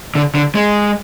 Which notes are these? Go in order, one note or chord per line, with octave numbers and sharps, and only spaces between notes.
D3
D3
G#3